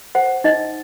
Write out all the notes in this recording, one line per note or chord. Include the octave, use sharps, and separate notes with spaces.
C5 F#5
D#4 D#5